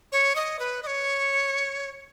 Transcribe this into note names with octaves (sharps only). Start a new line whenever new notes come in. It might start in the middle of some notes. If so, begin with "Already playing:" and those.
C#5
D#5
B4
D#5
C#5